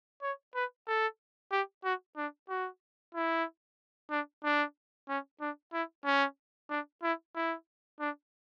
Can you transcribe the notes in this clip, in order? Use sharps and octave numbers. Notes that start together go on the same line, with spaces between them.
C#5
B4
A4
G4
F#4
D4
F#4
E4
D4
D4
C#4
D4
E4
C#4
D4
E4
E4
D4